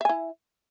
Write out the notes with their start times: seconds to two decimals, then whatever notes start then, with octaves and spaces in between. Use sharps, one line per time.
0.01 E5
0.05 G#5
0.09 E4